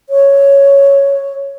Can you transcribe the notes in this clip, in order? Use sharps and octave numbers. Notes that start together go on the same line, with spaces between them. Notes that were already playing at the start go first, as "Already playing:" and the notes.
C#5